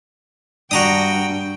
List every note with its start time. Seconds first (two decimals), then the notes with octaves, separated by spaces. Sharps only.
0.71 G2 D4 F#4 G5 A#5 D#6